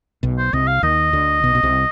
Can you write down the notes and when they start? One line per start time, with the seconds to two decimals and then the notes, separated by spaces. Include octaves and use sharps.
0.23 B1 B2
0.38 C5
0.53 C2 C3 D#5
0.68 F5
0.83 D#2 D#3 D#5
1.13 D2 D3
1.44 B1 B2
1.55 B2
1.63 C2 C3